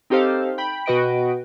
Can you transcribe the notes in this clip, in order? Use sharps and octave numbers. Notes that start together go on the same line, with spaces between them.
C4 D#4 G4 A4 C5 F5
G5 B5
B2 F#4 B4 D#5 G5 D7